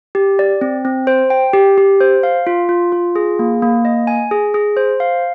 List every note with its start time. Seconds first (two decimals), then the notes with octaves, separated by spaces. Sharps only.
0.15 G4
0.39 D5
0.61 C4
0.85 C4
1.07 C5
1.30 G5
1.53 G4
1.78 G4
2.01 C5
2.23 F5
2.47 F4
2.69 F4
2.92 F4
3.16 G#4
3.39 A#3
3.62 A#3
3.85 D#5
4.07 G#5
4.31 G#4
4.54 G#4
4.77 C5
5.00 F5